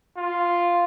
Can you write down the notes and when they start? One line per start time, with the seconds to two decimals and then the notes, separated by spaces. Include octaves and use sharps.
0.17 F4